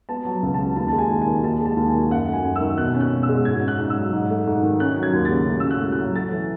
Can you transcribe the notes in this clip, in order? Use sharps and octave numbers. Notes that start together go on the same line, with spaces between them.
B3 A5
F#3
C#2
C#3 A5
D#2 A5
G#3 A5
G#5
D#2
D#3 G#5
D#2 A5
G#3
A5
D#2
G#5
D#3
F#2 F#5
A3 G#5
F#2
E6
D#3
B2 F#6
C#4
F#6
B2
E6
G#3
G#2 G#6
C#4
F#6
G#2
E6
F#3
G#2
A3
G#2
D#3
C#4 F#6
F#3
G#6
D#2
A6
C#3
A2
E6
C#4
F#6
A2
F#6
F#3
A3 A6
E3